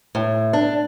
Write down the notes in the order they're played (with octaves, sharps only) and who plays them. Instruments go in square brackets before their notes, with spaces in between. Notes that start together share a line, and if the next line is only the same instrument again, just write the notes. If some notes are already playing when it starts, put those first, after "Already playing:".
[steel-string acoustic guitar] A2
D4